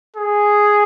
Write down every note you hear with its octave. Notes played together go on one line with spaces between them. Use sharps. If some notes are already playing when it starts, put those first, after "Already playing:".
G#4